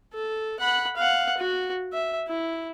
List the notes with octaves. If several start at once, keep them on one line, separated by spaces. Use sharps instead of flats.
A4
F#5 B5
F5 F#5
F#4
E5
E4